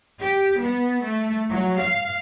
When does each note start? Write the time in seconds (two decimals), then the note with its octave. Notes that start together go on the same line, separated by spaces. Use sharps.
0.21 G4
0.60 B3
1.03 A3
1.51 F#3
1.80 F5